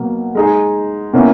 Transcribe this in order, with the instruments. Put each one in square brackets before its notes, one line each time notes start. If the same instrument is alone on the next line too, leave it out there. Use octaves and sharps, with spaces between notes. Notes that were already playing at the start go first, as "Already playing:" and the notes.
Already playing: [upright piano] B2 F#3 A#3
G#3 D#4 G#4
B2 A#3 C#4 E4